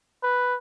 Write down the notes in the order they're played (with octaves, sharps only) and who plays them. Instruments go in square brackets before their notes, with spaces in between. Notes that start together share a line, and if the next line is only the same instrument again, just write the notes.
[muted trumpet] B4